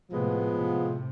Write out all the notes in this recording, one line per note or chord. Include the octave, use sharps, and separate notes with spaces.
A2 C3 F3 G#3 B3 F4
A2 C3